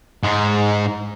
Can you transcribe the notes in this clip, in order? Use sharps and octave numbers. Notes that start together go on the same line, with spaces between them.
G#2 G#3